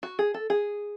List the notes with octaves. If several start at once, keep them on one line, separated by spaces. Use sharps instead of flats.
F#4
G#4
A4
G#4